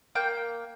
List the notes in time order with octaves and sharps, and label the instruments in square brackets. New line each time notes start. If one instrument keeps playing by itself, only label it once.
[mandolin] A#3 G5